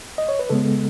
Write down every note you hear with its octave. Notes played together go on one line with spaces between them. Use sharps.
D#5
C#5
B4
C#3 G#3 B3 A4